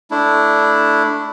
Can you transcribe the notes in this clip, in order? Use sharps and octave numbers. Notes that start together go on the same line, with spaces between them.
A3 D4 E4